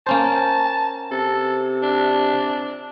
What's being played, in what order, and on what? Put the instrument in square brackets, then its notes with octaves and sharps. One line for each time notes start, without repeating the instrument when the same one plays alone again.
[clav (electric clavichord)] A#3 C#4 C5 [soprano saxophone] A5
[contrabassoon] C3 [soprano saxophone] A4
[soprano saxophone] D4